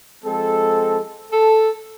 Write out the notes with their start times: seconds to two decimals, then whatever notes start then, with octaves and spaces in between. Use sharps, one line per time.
0.24 F3 G#3 C4 A4
1.33 A4